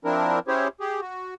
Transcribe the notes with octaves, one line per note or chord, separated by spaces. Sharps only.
F3 C4 D4 E4 A#4
C#4 E4 G4 G#4 C5 C#5
G4 G#4
F#4